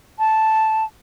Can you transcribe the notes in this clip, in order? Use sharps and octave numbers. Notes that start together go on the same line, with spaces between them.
A5